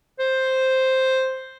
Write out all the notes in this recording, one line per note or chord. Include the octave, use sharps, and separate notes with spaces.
C5